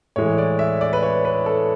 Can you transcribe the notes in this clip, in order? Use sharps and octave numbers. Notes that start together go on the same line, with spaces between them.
A2 E3 G#3 C#5
D5
E5
D5
B4
C#5
B4
A4